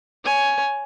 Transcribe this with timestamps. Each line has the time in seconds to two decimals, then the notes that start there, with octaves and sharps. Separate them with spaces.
0.24 C#5 G#5